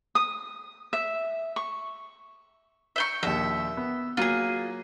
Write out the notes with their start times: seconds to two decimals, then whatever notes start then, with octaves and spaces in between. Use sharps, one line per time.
0.15 D#6
0.93 E5
1.56 C#6
2.96 E5 G5 C#6
3.23 A#1 D#2 E5
3.77 B3
4.17 F#3 A#3 F4 G#4